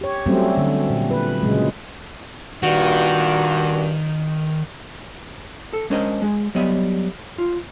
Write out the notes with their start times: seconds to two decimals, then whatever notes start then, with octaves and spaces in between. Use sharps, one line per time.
0.01 G4 C#5
0.26 F#3 G3 A3 C4 C#4
0.57 D3
0.90 A#2
1.11 B4
1.43 A#2 C#3 F#3 G#3
2.63 G2 A#2 D#3 F#4
5.73 A4
5.90 G#3 C#4 D4 A#4 C5 D#5
6.22 G#3 G#4
6.55 F#3 G3 B3 D#5 E5
7.38 F4